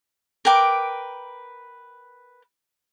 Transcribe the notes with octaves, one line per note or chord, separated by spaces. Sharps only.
A#4 B4 G5 D6